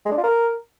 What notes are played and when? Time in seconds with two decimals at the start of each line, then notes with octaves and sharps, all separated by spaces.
0.06 G#3
0.12 D4
0.18 F4
0.23 A#4